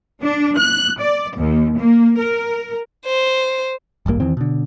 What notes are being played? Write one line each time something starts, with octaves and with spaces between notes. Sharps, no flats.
D4
F#6
D5
D#2
A#3
A#4
C5
D1 G#1 G2 A#3
E2 D#3 E3 C4
B2 D3